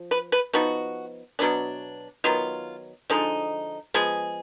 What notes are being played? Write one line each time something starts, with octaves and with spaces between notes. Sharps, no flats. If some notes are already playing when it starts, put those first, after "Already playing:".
Already playing: F3
B4
B4
F3 B3 D#4 F#4
B2 F#3 B3 D4
D#3 F#3 B3 F4
D3 F3 G#3 D#4
F3 G#3 B3 G#4